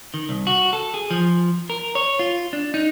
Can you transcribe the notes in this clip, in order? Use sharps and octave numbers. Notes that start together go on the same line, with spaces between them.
D#3
C2
F#4
A4
G#4
F3
A#4
C#5
F4
D4
D#4